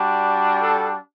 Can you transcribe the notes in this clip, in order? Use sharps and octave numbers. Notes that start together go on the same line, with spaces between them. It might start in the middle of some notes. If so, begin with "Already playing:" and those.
Already playing: G3 D4 F#4
A4